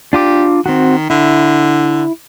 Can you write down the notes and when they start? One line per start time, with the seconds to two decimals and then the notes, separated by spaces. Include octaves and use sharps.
0.13 D4 F4 G4 D6
0.66 D#3 C4 F#4
1.10 D3 E4